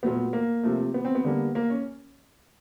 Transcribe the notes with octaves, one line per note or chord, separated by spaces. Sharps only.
A#2 F#3 A3 B3
A#3
C3 F3 A3
B3
C4
B3
D3 G3 A#3
A#3
C#4